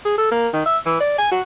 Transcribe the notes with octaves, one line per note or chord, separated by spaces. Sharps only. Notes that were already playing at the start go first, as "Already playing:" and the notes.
G#4
A4
A#3
D#3
E5
E3
D5
G#5
F#4